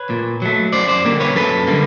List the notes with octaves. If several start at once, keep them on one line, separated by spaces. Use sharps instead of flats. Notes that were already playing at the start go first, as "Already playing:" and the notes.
Already playing: B4 C#5
A#2
F#3 A3
F#2 C5 D5
C5 D5
D3 G3 A#3
B4 C#5
F#2 A4 B4
D3 G3 A#3